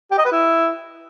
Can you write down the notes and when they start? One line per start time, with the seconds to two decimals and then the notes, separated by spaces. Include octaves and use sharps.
0.11 G4
0.18 D#5
0.25 B4
0.32 E4